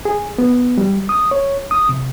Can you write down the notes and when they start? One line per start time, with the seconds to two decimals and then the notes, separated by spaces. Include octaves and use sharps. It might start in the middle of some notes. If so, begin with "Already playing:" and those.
0.05 G#4
0.38 B3
0.78 G3
1.09 D#6
1.31 C#5
1.71 D#6
1.89 C3